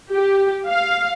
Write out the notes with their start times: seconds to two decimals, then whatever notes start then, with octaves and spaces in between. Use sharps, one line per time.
0.12 G4
0.68 F5